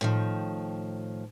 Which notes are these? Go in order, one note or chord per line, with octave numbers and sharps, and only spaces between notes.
A2 D#3 F3